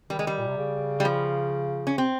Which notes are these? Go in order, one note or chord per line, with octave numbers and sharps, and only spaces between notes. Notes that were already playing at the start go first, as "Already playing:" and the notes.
D#3 G3
G#3
G3
A#2
C3
C#3
G3
F3
C#4
C3 C4